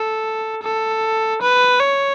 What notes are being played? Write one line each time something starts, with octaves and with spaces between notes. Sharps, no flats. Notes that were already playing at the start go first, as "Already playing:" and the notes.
Already playing: A4
A4
B4
C#5